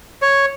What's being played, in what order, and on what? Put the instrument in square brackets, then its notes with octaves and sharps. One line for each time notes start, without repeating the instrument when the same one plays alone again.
[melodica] C#5